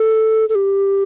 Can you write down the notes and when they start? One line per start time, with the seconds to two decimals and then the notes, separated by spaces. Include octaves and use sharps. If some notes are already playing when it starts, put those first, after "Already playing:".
Already playing: A4
0.49 A4
0.55 G4